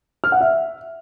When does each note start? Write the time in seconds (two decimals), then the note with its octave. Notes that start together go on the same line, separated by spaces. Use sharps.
0.24 F6
0.32 F#5
0.41 E5